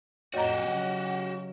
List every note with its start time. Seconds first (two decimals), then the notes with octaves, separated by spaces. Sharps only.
0.34 F2 A2 F#4 G4 C#5 D#5 F#5 A#5
0.63 C#3 F#3